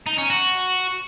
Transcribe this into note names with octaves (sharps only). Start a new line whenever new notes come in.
D#4
C#4
F#4